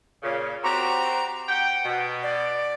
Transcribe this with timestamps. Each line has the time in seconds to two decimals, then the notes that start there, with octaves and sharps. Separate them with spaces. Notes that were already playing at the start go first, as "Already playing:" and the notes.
0.23 A#2 C#3
0.64 C4 F#4 G4 A#5
1.49 F#5 G5
1.84 B2
2.23 D5